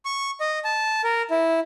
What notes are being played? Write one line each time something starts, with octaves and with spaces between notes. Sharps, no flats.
C#6
D#5
A5
A#4
E4